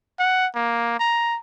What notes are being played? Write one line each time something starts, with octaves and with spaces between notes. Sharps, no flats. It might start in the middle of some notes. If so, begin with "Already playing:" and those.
F#5
A#3
A#5